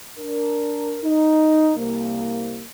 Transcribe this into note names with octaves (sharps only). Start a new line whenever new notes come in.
D4 A#4
D#4
C2 A#3